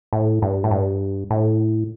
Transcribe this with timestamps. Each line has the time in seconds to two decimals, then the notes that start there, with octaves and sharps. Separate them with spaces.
0.13 A2
0.42 G2
0.64 A2
0.71 G2
1.31 A2